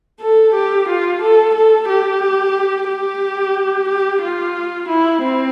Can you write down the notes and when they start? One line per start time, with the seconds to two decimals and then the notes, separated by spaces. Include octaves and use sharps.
0.21 A4
0.55 G4
0.89 F4
1.22 A4
1.55 A4
1.89 G4
2.89 G4
3.89 G4
4.22 F4
4.89 E4
5.21 C4